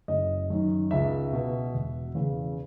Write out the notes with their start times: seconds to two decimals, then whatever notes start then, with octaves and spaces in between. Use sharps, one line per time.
0.08 F#1 D#5
0.50 F#2 D#3
0.91 C#2 E5
1.33 B2
1.74 E1
2.15 E2 C#3 E3